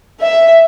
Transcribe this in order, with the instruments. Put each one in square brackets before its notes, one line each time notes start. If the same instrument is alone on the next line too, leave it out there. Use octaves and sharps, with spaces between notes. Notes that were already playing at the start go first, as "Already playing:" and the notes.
[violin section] E5